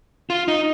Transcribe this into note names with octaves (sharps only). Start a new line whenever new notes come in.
F4
D#4